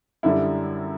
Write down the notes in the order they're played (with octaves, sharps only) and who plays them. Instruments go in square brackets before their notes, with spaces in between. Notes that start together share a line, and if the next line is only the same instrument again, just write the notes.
[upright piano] F#2 D3 G3 E4